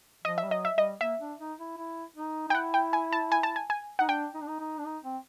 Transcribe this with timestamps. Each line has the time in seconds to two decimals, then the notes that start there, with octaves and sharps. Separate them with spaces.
0.24 F3 D#5
0.38 E5
0.44 G3
0.49 F#3 D#5
0.65 E5
0.76 G3 D#5
1.01 A#3 E5
1.20 D4
1.40 D#4
1.59 E4
1.77 E4
2.16 D#4
2.48 D#4
2.50 G5
2.54 E4 F#5
2.74 G5
2.93 G#5
3.13 A5
3.32 G#5
3.43 A5
3.56 G#5
3.70 G#5
3.99 D#4 F#5
4.08 D4 G5
4.34 D#4
4.41 D4
4.48 D#4
4.60 D#4
4.78 D4
4.85 D#4
5.04 C4